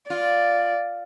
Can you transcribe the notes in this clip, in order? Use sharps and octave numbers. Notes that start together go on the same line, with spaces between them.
F4 D5